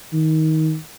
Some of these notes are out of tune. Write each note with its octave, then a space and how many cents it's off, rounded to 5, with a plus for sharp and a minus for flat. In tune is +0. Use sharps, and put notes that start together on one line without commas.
D#3 +20